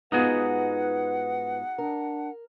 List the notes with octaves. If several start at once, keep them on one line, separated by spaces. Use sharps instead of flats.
G#2 B3 D#4 F4 F#4 G#4 B4 F#5
D4 A#4